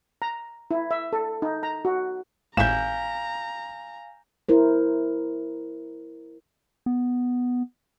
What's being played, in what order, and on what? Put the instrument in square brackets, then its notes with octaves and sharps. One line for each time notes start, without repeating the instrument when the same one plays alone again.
[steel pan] A#5
E4
E5
A4
D#4
A#5
F#4
[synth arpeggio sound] G#1 A2 E5 [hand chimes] F5 G#5 [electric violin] A#5 [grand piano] G6 E7
[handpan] E4 A#4 C5
[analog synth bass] B3